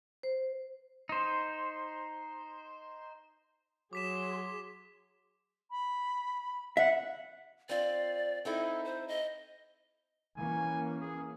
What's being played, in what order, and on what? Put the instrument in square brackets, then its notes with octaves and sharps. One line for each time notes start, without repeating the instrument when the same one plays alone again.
[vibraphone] C5
[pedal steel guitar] D#4 C5
[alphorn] F#3 [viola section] G#4 C6 [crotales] D6 B6 E7
[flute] B5
[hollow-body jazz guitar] E5 [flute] F#5
[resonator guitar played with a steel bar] C4 F4 [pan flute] D5
[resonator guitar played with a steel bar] C4 D#4 E4 [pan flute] A4
[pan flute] C5
D#5
[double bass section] E3 A#3 C#4 [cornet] G#5
[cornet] G#4